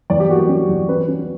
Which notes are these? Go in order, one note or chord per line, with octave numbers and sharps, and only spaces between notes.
E2 D5
G4
A#3 F#4
G4
C#4
E2
C#4 B4
C#4